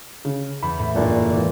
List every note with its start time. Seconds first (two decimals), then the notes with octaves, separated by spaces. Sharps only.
0.25 C#3
0.63 E2 B5
0.79 A2
0.96 F#1 A#2 D4
1.33 G#1 E3